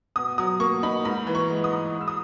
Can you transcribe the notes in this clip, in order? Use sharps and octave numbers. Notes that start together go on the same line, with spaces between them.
B2 D#6
F#3 D#6
A#3 C#6
D#4 B5
G#2 B5
E3
C#6
G#3
D#6
G#2
G#2
E6
D#6